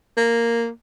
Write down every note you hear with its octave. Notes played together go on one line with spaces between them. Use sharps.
A#3